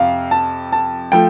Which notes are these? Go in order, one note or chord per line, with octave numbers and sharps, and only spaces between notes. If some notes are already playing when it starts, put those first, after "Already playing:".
Already playing: F2 C3 F5
A5
A5
F3 A3 G5